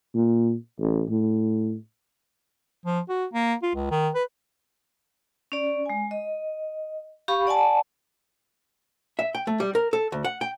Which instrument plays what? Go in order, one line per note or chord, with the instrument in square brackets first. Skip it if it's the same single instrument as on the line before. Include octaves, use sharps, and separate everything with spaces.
[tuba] A#2
A1
A2
[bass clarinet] F3
F#4
A#3
F4
C#2
D#3
B4
[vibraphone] C#4 D5
G#3 G#5
D#5
G4 F5 B5 C#6
D5 F#5 G#5 A5
[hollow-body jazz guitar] E5
G5
A3
G3
A#4
A4
D2
F#5
G5